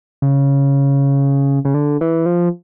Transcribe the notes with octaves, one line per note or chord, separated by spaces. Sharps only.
C#3
C#3
D3
E3
F3